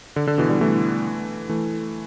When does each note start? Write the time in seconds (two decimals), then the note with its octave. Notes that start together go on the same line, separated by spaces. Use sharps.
0.16 D3
0.27 D3
0.38 B2 E3
0.50 D3 G3
0.61 E3 A3
1.49 E3 A3